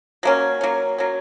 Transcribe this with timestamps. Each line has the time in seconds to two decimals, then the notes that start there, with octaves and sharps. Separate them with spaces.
0.23 F#3 A#3 C#4
0.61 F#3 A#3 C#4
0.98 F#3 A#3 C#4